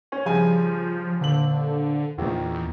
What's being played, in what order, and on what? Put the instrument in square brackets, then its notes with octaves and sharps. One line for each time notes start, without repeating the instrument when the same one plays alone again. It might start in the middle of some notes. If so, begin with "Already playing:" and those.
[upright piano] C#4
[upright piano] G2 C#3 G#5 [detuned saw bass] F3
[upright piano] D#1 F#7 [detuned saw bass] D3
[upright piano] A#1 D#3 [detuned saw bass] E2